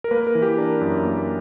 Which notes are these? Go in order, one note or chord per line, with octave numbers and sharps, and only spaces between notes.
A#4
A#3 B4
A#4
E3
G4
D4 A#4
F#2
A#3